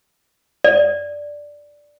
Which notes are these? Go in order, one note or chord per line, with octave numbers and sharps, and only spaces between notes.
D5